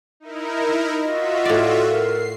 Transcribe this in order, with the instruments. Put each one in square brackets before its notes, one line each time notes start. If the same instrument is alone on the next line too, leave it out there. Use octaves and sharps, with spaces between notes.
[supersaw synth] D#4 E4 A#4
[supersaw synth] F4 F#4 E5 [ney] D#5
[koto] A2 D5
[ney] A#4 [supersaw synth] C7